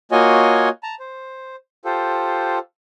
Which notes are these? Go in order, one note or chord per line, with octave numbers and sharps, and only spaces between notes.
A#3 F4 F#4 C#5 D#5 G#5
A5 A#5
C5
F4 G4 A4 C5